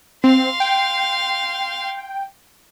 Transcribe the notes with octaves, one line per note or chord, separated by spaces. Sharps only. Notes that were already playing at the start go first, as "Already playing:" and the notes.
C4 F5 C6
G5